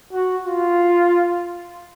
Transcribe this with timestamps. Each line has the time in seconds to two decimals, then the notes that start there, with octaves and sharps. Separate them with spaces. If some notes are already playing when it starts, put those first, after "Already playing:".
0.13 F#4
0.44 F4